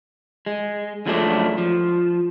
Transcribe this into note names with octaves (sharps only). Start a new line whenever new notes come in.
G#3
F#2 F3 F#3 G#3 A3 D4
F3